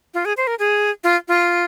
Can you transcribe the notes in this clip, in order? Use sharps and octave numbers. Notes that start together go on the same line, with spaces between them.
F4
G#4
C5
A#4
G#4
F4
F4